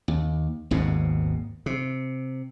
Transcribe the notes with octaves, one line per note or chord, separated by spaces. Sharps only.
D#2
G#1 D#2 G#2 B2
C3